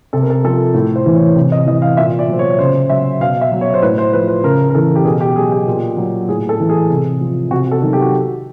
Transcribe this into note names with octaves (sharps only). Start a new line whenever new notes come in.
C3 A4
A#4
A4
F3 A4
A2
C5
E3
C#5
C3
D#5
E3 D#5
F5
A#2 E5
D5
F#3 C5
C#5
C#3 C5
F#3 E5
B2 F5
E5
F#3
C#5
C5
A2 B4
C5
F3 B4
B4
C#3 A#4
A#4
E3 A4
G4
B2 G#4
G4
F#3 G#4
G4
A#2
F#3
A2 G#4
A4
E3
G#4
C3
F3
C3 F#4
A4
D#3 F#3
G4
F#4